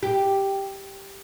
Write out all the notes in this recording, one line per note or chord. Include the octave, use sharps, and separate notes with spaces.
G4